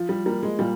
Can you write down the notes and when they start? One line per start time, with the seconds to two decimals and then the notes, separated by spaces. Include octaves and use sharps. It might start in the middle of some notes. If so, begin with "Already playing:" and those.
Already playing: F3
0.09 G3
0.26 G3 A#3
0.43 G#3
0.59 A#2 G3